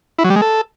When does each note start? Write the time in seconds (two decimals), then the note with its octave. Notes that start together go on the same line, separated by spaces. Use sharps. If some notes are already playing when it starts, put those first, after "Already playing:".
0.19 E4
0.24 F#3
0.30 G3
0.36 G#3
0.42 A4